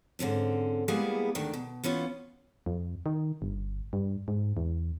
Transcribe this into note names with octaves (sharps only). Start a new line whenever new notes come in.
G#2 D3 C4 C#4
G3 G#3 A#3 B3 E4 G#4
D2 D#3 D4
B2
E3 B3 C#4 F4
F2
D#3
G1
G2
G#2
E2